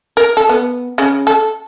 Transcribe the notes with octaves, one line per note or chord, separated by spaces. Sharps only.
A#4
A4
B3
C#3
A4